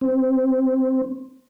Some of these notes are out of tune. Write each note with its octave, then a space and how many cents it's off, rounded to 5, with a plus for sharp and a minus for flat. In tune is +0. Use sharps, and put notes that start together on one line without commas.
C4 -5